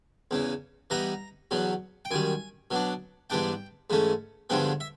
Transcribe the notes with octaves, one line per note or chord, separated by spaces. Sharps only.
E2 C#3 E3
E3 G3 B3 D#4 A#5
E2 B2 F#3 B3
G5
F#2 D#3 G3 G#5
B2 F#3 B3 D4
G#2 E3 G3 B3 D4 G5
G#2 E3 A3 C#4
G2 D3 F3 G#3 B3 G5
E5